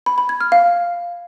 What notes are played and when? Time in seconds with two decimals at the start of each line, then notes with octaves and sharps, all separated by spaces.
0.06 B5
0.18 B5
0.29 G#6
0.41 F6
0.52 F5